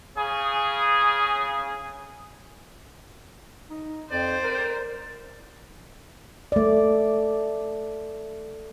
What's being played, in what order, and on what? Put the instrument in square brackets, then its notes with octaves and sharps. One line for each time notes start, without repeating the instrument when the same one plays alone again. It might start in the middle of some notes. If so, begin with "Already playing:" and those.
[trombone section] C#3 G#4
[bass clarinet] D#4
[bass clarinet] F2 [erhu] C5 [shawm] D5
[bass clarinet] A#4
[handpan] A3 D5